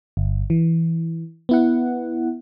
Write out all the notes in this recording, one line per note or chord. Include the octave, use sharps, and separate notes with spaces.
G1
E3
B3 E4 F#5